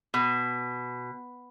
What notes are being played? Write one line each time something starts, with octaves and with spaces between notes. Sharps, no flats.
B2